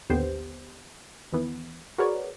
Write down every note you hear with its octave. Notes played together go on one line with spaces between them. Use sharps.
A1 D#2 D3 B3 G4 C5
D#2 E3 B3
F#4 G#4 A#4 B4 C#5 D5